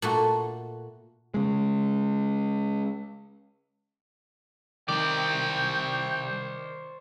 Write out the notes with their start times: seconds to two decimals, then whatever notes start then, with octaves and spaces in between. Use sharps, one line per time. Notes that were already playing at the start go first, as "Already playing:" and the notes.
0.02 A#2 A3 F#4
1.34 C#3 G#3
4.88 C2 D#3 G4 C5 D5 G5